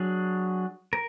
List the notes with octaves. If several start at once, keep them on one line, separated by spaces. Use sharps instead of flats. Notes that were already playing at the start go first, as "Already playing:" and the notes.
Already playing: F#3 D4 G#4
A#4